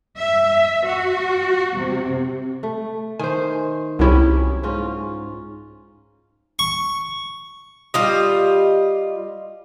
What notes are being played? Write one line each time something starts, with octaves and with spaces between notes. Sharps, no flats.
E5
F#4
C3
A3
D#3 C5 G#5
C2 F#3 C#4 E4 G4
G#2 C#4 F4
C#6
G3 F4 D#5